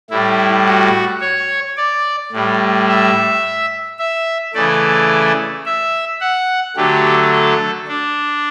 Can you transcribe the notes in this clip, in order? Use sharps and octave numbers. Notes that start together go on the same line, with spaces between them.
A2 G3 E4
F#4
C#5
D5
A2 G3
E5
E5
C#3 E3 A3 D5
E5
F#5
D3 F#3 A3 G4
A4
D4